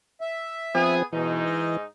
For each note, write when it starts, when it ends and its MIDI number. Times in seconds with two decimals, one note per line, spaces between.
0.21 0.95 76
0.75 1.03 53
0.75 1.03 59
0.75 1.03 60
0.75 1.03 68
1.13 1.83 44
1.13 1.44 47
1.13 1.77 52
1.13 1.83 63
1.45 1.76 75